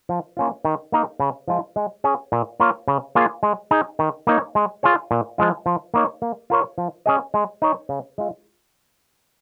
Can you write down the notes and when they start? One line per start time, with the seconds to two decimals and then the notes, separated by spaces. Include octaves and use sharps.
0.09 F3
0.37 A#3 C#4 F4
0.65 D#3
0.92 A#3 D#4 A#4
1.20 C#3
1.48 F3 G#3 F4
1.76 G#3
2.04 C#4 G#4
2.32 A#2
2.60 A#3 F4 A#4 C#5
2.88 C#3
3.15 A#3 F4 G#4 C#5
3.43 G#3
3.71 D#4 G#4
3.99 D#3
4.27 A#3 D#4 C#5
4.55 G#3
4.83 F4 G#4 C#5
5.11 A#2
5.38 F3 G#3 F4
5.66 F3
5.94 A#3 D#4 C#5
6.22 A#3
6.50 F4 A#4 C#5
6.78 F3
7.06 C#4 G#4 D#5
7.34 G#3
7.62 D#4 C#5
7.89 C#3
8.18 G#3 F4